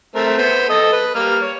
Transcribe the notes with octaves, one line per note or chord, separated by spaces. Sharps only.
A3 C4 A#4
B3 C5
A4 D#5 D#6
B4
G3 A#3 F6
C#5